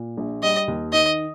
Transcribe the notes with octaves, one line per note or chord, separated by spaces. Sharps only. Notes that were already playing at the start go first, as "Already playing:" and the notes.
Already playing: A#2
A#1
G3 D#5
D#2
D#3 D#5